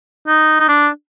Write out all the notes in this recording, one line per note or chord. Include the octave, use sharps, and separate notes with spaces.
D#4
D#4
D4